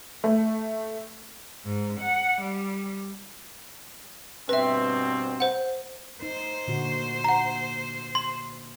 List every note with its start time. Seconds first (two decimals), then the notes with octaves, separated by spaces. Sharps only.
0.24 A3
1.66 G#2
2.00 F#5
2.41 G3
4.49 G2 B2 C4 B4 E5
5.40 C5 F#5
6.22 D#4 C5
6.68 A#2 D3 F#4
7.24 F#5 A#5
8.15 C6